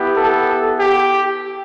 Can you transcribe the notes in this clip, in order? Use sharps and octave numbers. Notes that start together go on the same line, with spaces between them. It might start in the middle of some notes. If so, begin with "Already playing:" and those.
Already playing: B3 E4 G4
A4
G4